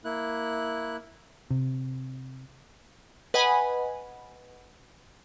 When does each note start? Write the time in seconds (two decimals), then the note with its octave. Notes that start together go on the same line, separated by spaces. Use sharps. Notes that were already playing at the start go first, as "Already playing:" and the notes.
0.05 A#3 E4 F#6
1.50 C3
3.34 B4 D#5 F#5 G#5 B5